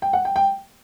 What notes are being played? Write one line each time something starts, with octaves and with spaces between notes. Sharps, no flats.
G5
F#5
G5
G5